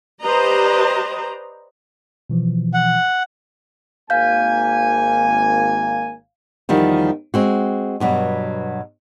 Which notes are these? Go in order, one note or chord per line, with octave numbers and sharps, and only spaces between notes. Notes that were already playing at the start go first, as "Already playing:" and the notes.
G4 B4 C5 D5 D#5 A#5
B2 E3 F3
F#5
G#1 A#3 F5 G#5 G6
E2 D#3 F3 G3
G#3 C4 F#4
G2 B2 F#3